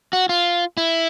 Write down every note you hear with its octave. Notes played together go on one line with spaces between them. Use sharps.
F#4
F4
E4